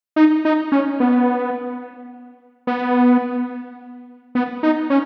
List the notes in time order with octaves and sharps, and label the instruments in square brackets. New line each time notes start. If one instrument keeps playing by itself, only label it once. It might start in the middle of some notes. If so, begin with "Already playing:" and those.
[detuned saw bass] D#4
D#4
C#4
B3
B3
B3
D#4
C#4